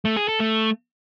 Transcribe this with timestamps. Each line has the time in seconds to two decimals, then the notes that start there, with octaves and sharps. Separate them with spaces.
0.05 A3
0.17 G#4
0.28 A4
0.40 A3